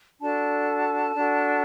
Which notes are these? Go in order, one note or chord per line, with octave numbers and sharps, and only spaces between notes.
D4 F#4 A4 A5
D4 F#4 A4